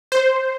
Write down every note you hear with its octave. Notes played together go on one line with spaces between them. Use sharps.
C5